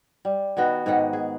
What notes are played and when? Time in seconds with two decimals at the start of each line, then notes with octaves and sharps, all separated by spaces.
0.25 G3
0.57 B2 D#3 B3 F#4
0.86 G#2 B2 D#3 F#5
1.13 G#4